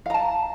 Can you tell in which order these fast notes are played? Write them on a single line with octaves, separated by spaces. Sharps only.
F5 A#5 A5